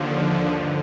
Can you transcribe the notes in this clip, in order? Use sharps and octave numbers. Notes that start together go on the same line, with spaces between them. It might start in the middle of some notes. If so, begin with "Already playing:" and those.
Already playing: D#2 D3 F3
D#6
G2 D3 F6